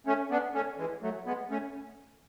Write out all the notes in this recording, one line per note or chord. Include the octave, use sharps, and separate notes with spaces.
A3 C#4
B3 D4
A3 C#4
E3 G#3
F#3 A3
G#3 B3
A3 C#4